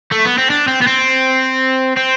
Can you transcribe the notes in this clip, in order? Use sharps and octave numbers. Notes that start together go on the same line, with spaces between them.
A3
B3
C4
D4
C4
B3
C4
C4